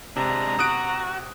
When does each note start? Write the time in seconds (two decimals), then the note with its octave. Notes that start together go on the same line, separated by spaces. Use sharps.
0.16 C3 G#3 D4 A#5
0.59 F#4 D#6 F#6 D7